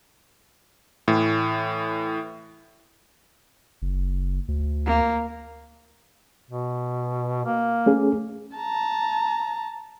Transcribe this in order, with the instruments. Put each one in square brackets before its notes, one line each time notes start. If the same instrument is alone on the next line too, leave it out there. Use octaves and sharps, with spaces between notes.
[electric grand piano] A2 E3
[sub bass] F#1
D2
[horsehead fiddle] A#3
[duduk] B2
A#3
[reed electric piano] A3 C#4 G#4
[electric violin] A5 A#5